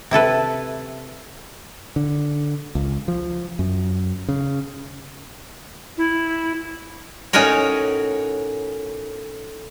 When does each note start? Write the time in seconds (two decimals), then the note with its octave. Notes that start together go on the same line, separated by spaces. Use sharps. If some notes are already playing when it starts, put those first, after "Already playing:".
0.11 C3 E4 A4 B4
1.96 D3
2.75 C#2
3.08 F3
3.59 F#2
4.29 C#3
5.98 E4
7.33 A2 C#4 D#4 F#4 A#4 C#5